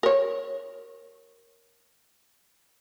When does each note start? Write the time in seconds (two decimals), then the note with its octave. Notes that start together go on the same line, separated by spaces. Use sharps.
0.03 A#4 C#5